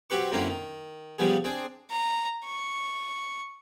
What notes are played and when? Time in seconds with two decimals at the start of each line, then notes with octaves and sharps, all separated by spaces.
0.10 F#3 C4 G4 B4 C#6
0.32 F#2 D3 A#3 C4 C#4 E4
0.50 D#3
1.18 C#3 F3 G3 B3 G#4
1.44 C4 D4 G#4
1.90 A#5
2.45 C#6